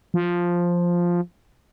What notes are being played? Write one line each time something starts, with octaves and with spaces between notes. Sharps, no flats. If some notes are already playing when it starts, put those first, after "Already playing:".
F3